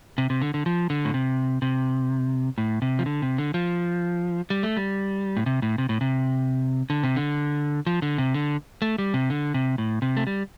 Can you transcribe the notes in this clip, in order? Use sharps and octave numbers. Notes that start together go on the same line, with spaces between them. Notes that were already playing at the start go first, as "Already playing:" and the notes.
C3
C3
D3
D3
F3
D3
A2
C3
C3
A2
C3
F3
D3
C3
D3
F3
G3
A3
G3
A2
C3
A2
C3
A2
C3
D3
C3
D3
F3
D3
C3
D3
A3
G3
C3
D3
C3
A2
C3
A3
G3